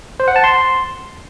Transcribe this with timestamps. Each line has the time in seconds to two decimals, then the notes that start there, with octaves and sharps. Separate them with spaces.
0.20 C5
0.28 F#5
0.36 A5
0.44 C6